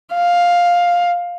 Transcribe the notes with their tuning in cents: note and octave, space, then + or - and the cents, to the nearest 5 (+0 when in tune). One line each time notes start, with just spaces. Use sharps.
F5 +10